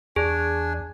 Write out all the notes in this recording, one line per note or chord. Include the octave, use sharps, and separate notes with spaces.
E2 D4 G#4 G#5